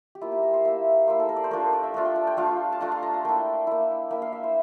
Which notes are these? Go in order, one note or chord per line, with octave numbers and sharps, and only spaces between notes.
G4
A#3 E4 F4
G4
A#4
C5
A#3 E4 E5
A#3 E4 C5
A4
A#4
D5
C5
A3 D4 F4 A#4
D5
E5
A3 D4 F4
G5
A5
G5
A3 D4 F4 F5
A5
A3 D4 F4 A#5
C6
A#5
A5
A#3 E4 G5
A#3 E4
A#3 E4 G5
F5
E5
C5